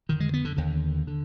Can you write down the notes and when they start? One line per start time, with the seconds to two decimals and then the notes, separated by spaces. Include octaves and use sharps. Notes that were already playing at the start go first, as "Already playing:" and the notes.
0.09 F2 D3 D#3
0.20 G#3
0.34 B3
0.45 D3
0.57 D#2 D3
1.07 D3